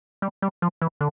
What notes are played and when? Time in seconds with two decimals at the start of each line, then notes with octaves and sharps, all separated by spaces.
0.22 G3
0.42 G3
0.62 F3
0.82 E3
1.01 D3